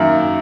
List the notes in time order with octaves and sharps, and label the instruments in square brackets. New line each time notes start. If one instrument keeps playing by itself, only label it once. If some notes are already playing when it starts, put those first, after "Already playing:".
Already playing: [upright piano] F#2 D#3 A#3 [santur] E5